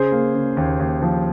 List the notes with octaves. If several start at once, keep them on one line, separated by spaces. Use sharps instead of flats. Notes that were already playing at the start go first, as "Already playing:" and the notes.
Already playing: C#3 G#4 C5
A#3
C#3
D#2
D#2
F3